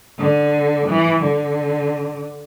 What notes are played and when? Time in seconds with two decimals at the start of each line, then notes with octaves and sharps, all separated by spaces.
0.18 D3
0.88 E3
1.24 D3